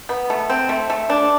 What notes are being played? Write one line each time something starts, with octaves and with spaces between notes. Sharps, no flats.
B3
A3
C4
A3
A3
D4